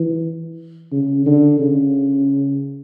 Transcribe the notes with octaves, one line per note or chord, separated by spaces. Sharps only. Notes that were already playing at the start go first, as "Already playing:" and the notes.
Already playing: E3
C#3
D3
C#3